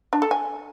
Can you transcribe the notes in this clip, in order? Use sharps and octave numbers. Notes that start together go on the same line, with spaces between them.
D4
A4
G#5